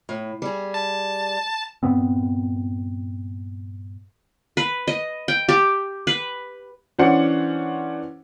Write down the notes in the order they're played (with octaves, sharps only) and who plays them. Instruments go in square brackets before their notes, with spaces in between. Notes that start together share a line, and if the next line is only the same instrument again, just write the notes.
[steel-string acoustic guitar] A2
G3 G#4
[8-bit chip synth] A5
[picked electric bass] G2 A#2 B3 C4
[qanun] B4
D#5
G5
G4
B4
[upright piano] E3 C#4 D4 C5 F#5 C#7